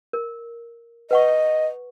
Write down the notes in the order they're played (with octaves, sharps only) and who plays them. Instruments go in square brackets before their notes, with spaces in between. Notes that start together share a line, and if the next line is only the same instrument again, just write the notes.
[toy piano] A#4
[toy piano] B4 F#5 C#6 [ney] D#5